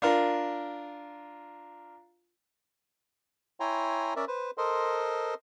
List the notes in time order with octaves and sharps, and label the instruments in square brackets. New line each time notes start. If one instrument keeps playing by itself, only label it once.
[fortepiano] D4 F4 A#4
[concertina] E4 C#5 G5 G#5 A#5 C6
C#4 A#4 D5 E5
B4 C5
A4 A#4 C5 D#5 C6